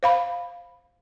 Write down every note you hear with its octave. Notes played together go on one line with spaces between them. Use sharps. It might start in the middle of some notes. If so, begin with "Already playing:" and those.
C5 F5 B5